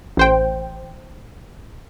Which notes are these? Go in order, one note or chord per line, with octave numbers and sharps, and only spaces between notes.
A1 C5 G5